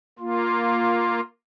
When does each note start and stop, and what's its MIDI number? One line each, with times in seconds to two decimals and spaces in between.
0.19 1.20 58
0.19 1.20 65